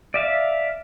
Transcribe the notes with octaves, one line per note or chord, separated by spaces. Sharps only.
D5 E5 F5